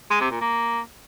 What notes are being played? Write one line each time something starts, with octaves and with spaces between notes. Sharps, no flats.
G#3
C3
A#2
A#3